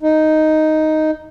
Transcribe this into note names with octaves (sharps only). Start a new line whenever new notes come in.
D#4